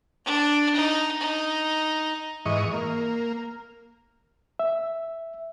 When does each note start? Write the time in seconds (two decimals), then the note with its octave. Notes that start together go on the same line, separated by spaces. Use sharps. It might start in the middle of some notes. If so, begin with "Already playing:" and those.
0.25 D4
0.75 D#4
1.21 D#4
2.45 G#2 E3 D#5 C#6
2.73 A#3
4.59 E5